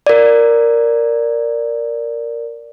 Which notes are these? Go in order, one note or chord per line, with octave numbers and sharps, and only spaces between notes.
A#4 D5